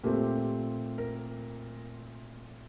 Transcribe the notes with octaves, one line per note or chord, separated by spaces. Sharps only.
A#2 A3 C4 G4
A#4